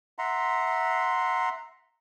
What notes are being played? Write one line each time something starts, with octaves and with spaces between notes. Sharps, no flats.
E5 F#5 A#5 C6